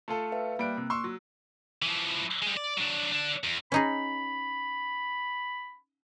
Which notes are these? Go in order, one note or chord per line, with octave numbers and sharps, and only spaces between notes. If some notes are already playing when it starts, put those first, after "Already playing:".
A3 F4 A4
B4 E5 F5
G3 A#3 F#6 D7
C3
C6 C#6 E6
F#3
E3 F3
G3 G#3
D5
F#3 D4
D3 D4
E2
C#4 D#4 G#4 B5